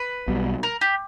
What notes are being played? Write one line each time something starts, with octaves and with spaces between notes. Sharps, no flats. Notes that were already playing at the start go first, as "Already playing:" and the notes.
Already playing: B4
B1 B2 G3
A#4
G4